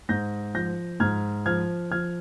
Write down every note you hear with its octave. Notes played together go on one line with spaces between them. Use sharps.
G#2 G6 A#6
F3 G6 A#6
G#2 F6 G#6
F3 F6 G#6
F3 F6 G#6